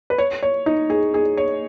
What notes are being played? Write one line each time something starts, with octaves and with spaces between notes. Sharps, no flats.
B4
C#5
C#5
D#4
G#4
G#4
C#5